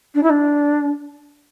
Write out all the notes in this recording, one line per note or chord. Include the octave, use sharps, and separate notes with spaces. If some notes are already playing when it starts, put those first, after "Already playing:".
D4
E4
D4